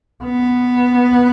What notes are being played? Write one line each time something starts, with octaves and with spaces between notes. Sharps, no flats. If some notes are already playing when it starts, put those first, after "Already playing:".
B3